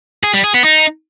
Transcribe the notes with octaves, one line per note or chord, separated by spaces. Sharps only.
G#4
G3
G#4
B3
D#4